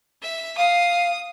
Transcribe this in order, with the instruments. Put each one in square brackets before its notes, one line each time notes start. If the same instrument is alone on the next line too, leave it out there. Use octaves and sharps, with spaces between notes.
[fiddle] E5
[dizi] F5 [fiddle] D#6